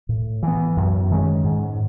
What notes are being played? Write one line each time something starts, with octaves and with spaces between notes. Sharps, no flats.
A2
E3 B3
F#2
D#3 G#3 C#4
G#2